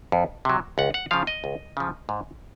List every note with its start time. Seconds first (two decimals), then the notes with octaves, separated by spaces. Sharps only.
0.12 F2
0.45 C3 F#3
0.78 C#2 F#5
0.94 F#5
1.11 C#3 F3 F5
1.27 D#5
1.44 C#2
1.77 C#3 F3
2.09 G#2